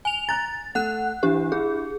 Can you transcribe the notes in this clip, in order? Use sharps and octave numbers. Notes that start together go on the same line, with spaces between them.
G#5 F7
A#5 F#6 A6
A3 F#5 F#6
E3 D4 G4
E4 G#4